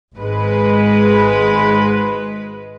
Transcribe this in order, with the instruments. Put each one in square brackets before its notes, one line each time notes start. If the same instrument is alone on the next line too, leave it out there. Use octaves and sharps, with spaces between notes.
[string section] G#1 G#2 G#3 B4